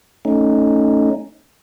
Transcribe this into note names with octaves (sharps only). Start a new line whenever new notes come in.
A3 C#4 D#4